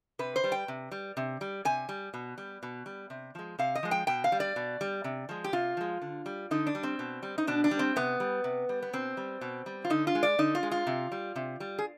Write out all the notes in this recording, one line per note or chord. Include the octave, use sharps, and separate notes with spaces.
C3 B4
C5
G3
G5
C3
G3
C3
G3
C3 G#5
G3
B2
G3
B2
G3
C3
F3 G#3
C3 F5
D#5
F3 G#3
G5
B2 G5
F5
G3
D5
B2
G3
C3
F3 G#3
G4
C3 F4
F3 G#3
D3
G3
D3 D#4
D4
G3
C4
B2
G3
D#4
B2 D4
D4
G3
C4
C3 B3
G3
C3
G3
B3
B2 C4
G3
B2
G3
F4
D3 D#4
F4
G#3
D5
D3 D#4
F4
G#3
F4
C3
G3
C3
G3
G#4